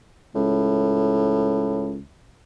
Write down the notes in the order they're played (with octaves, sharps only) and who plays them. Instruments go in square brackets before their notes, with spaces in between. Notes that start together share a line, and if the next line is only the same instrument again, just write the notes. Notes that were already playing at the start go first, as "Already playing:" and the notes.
[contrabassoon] C#2 [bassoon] A2